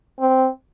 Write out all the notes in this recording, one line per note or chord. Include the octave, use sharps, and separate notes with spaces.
C4